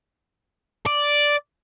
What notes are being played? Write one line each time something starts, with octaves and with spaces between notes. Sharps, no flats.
D5